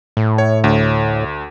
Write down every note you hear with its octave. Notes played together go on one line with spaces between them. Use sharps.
A2
C#5
D2